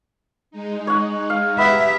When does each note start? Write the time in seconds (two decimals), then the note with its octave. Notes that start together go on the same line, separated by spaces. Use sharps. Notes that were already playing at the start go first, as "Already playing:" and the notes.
0.51 G#3 D#4
0.87 C#5 F#5
1.30 F5
1.58 B3 G4 E5 A#5